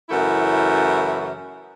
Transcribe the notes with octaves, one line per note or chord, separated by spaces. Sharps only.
F#2 C#3 E3 A3 E4